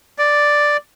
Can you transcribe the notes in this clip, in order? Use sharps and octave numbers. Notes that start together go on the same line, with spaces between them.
D5